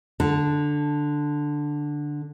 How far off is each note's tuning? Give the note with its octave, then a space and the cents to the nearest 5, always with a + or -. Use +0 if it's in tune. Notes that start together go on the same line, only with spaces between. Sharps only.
D3 +5 A5 +0